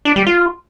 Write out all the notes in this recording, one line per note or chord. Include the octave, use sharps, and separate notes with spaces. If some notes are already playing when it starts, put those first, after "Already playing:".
D4
G3
F4